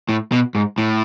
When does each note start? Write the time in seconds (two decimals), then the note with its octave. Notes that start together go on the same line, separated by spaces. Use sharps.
0.09 A2
0.32 B2
0.55 G#2
0.78 A2